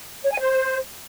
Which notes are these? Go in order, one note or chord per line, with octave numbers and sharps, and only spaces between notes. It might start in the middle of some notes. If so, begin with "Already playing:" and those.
C#5
G#5
C5